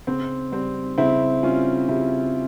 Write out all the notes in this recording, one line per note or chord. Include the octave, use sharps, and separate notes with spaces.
C#3 C4
G3 C4
C#3 C4 E4
G3 C#4 F4
C#3 E4 G4